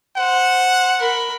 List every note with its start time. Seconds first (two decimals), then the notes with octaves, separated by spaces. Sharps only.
0.17 C5 F#5
0.99 A#4 B5